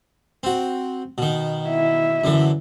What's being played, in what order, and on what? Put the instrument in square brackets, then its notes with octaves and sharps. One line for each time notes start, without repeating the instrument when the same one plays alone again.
[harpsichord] C4 F#4
B2 D#3
[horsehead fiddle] E4 E5
[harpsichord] F#2 D3 E3